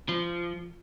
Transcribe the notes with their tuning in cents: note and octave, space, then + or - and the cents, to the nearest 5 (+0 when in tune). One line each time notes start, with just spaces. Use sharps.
F3 -20